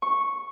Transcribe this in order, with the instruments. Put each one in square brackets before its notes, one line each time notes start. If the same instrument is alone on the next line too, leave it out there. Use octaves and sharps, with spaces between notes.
[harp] C#6